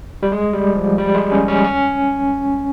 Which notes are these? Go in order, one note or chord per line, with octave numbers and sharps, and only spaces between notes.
G3
G#3
G3
F3
G3
G#3
C#4
C#4
C#4